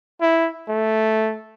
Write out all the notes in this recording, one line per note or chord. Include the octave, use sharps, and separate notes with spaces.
E4
A3